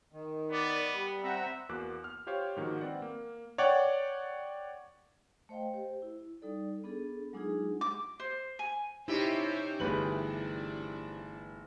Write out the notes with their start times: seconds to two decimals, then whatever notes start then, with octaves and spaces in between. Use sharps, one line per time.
0.13 D#3
0.51 B3 D5
0.92 G3
1.24 C4 E5 F#5 A#5
1.69 E2 A#3 F#4 D6 F#6
2.04 F6
2.27 F4 G4 C5 C#5 F5
2.56 G#2 D#3 F3 A#3 F#4
2.81 C4 B4 D5 F#5
3.02 A#3
3.58 C#5 D5 F#5 G5
5.49 A3 C5 D#5 F5 G5
5.73 G4 C5
6.02 E4
6.42 G3 D#4 A4 D5
6.84 B3 D4 G#4 A4
7.33 F#3 G#3 D4 D#4 F4 G#4
7.81 D6
8.20 C5
8.59 G#5
9.08 C3 C#4 D#4 E4 G4 C5 C#5
9.80 G1 E3 A3 D4 E4 G#4 B4 F#7